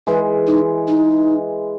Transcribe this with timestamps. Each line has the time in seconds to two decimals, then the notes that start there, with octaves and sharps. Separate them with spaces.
0.07 E3 G#3 B4
0.47 D#4
0.88 D#4